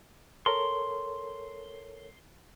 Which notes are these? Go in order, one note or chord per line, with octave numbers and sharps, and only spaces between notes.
A4 A#4 C#5 C6